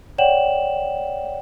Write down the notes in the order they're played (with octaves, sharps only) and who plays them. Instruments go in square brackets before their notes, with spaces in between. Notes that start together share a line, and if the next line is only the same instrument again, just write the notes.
[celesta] C#5 D5 F#5 G5 E7 F#7